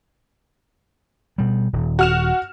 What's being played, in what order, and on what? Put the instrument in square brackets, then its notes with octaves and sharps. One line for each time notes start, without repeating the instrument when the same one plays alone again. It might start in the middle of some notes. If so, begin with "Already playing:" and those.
[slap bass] B2 G3
D#1
[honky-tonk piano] F#4 F6 E7